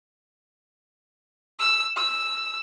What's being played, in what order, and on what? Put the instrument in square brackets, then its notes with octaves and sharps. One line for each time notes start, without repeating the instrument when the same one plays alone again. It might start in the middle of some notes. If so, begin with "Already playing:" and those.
[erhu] E6
E6